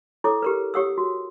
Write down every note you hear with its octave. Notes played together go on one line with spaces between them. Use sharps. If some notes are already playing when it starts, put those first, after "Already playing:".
E4 A4 C#5 D6
G4 A#4 B4
G4 C#5 F#5 D#6 E6
F#4